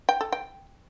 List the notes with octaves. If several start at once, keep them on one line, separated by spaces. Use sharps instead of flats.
G5
A4
G5